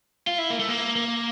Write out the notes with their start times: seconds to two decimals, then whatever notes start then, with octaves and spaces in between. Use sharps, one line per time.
0.27 F4
0.38 E4
0.50 A#3
0.59 A3
0.69 A#3
0.96 A#3